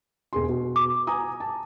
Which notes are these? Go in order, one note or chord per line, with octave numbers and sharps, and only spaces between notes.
E1 G#4 C6
B2
D6
G#5 A#5 D#6
A5